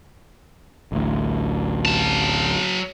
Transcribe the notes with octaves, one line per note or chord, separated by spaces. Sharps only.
A1 D2
F#3 A5